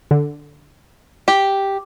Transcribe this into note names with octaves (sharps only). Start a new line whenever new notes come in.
D3
G4